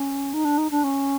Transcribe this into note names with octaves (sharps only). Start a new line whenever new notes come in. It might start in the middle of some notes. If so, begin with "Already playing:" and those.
Already playing: C#4
D#4
D4
D#4
D4
C#4